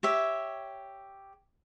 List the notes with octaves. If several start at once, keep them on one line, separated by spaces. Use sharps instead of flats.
G4 C#5 E5